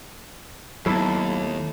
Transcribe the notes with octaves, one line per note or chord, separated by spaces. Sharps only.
D#2 F#3 A3 B3 E4